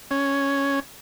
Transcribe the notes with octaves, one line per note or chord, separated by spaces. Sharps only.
C#4